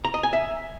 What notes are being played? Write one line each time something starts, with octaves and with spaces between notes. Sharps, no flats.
A#5
D#5
G#5
E5